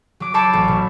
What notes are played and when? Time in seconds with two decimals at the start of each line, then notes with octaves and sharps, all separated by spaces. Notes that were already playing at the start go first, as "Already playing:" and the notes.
0.20 F#3 D6
0.34 A4 C5 C#5 A5 B5 D6
0.53 A1
0.68 B2